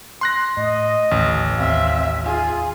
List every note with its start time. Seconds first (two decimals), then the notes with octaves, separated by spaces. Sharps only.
0.21 C6 F#6 A#6
0.57 A2 D#5
1.11 A1 D#2 D3 E3
1.58 D#2 C4 E5 F5
2.24 F4 G#4